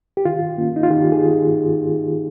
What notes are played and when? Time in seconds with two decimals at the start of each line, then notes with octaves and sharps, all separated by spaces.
0.17 G4
0.25 D#3 F4
0.58 A#3 C#4
0.76 D#4
0.83 F4
0.90 D#3 G4
1.12 G#4